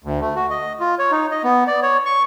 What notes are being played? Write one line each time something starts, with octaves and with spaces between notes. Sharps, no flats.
D2
A3
F#4
D#5
F4
C#5
D#4
D#5
B3
D5
C#5
C#6